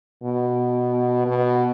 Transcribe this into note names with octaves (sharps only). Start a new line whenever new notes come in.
B2
B2